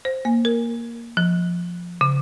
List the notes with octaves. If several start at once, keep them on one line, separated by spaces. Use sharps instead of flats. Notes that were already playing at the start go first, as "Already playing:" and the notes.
C5
A#3
A#4
F3
C#3